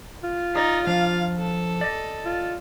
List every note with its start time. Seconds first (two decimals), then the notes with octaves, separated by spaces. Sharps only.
0.23 F4
0.56 D#4 G#4 D5
0.87 F3 D4 F5
1.38 A4
1.81 D5 D#5
2.25 F4